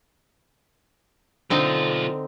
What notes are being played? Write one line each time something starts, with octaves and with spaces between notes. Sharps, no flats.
B1 D3 C4 D#4 F4